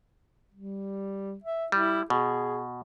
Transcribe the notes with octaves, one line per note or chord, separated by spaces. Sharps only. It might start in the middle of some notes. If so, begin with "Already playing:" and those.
G3
E5
G3 E4
B2 G#4